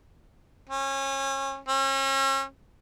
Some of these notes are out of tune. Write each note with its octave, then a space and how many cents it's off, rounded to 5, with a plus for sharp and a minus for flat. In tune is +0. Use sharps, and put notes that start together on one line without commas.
C#4 -30
C#4 -40